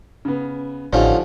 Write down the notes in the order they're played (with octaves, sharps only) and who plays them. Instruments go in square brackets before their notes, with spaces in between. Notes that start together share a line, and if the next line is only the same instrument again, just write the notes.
[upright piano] C#3 B3
[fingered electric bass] A1 [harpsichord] D3 C#4 F4 [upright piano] F3 [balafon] D#4 G4 D#5